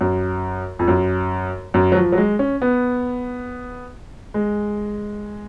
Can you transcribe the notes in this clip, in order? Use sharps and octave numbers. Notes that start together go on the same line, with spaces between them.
F#2
F2
F#2
F#2
F#3
F3
F#3
G#3
C#4
B3
G#3